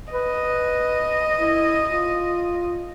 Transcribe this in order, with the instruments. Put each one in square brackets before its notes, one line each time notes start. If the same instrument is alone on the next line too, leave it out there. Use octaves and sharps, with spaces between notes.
[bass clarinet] B4 [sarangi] D#5
[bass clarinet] E4
F4